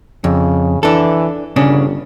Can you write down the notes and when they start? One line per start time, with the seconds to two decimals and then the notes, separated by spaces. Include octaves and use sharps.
0.24 F2 C#3
0.83 E3 D4 A4
1.56 G1 C#3 C#4 D4